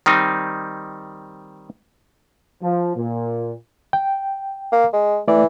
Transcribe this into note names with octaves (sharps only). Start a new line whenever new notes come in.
D#3 G3 C4 D#4
F3
A#2
G5
A#3
G#3
E3 A3 D5